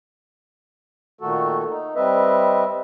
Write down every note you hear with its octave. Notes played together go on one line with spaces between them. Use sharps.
A#2 D#3 A3 F#4 A4
D#4
G3 C4 B4 D#5 E5